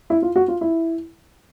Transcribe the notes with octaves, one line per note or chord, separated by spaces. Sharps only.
E4
F4
F#4
F4
E4